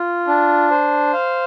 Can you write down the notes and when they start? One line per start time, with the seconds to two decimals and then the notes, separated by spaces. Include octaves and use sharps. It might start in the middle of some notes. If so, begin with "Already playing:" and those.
Already playing: F4
0.27 D4
0.71 C5
1.13 F5